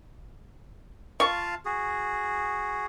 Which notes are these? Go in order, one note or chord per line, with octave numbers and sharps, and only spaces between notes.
F4 F5 A5 C#6
F#4 G#4